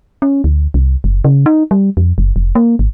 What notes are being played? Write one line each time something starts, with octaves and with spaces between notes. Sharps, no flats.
C#4
D2
C2
F#1
C#3
D#4
G3
F2
F#1
F1
A#3
G#1